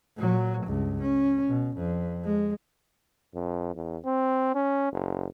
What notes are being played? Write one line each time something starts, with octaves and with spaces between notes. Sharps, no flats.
A#2 F#3
C#2 G2
C#4
B2
F2
G#3
F2
E2
C4
C#4
F#1